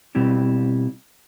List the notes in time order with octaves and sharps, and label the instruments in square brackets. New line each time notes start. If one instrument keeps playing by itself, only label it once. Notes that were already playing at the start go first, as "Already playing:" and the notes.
[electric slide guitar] B2 G3 C4 E4 G4